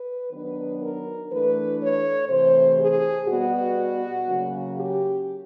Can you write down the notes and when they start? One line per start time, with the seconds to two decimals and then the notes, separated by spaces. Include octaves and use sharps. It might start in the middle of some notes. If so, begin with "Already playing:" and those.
Already playing: B4
0.32 D#3 F#3 B3 D4 B4
0.80 A#4
1.31 E3 A3 D4 B4
1.79 C#5
2.28 C3 E3 A3 C5
2.78 G#4
3.27 B2 G3 B3 F#4
4.26 C#3 F#3 A#3 C#4
4.75 G4